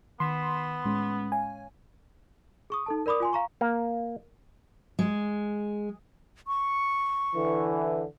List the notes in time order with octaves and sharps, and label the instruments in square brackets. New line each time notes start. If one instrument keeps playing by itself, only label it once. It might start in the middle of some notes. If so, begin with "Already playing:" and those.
[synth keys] D#3 B6 E7 [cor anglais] B3 [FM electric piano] C6
[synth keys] A2 G#3 C#4
[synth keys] C#5 F5 [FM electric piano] G#5
[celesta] G#4 C#6 D#6
D#4 A4 A5
A#4 D5 B5 D6 D#6
F4 G#5 C6
F5 A#5 C#6
[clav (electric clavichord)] A#3
[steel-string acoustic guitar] G#3
[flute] C#6
[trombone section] D3 E3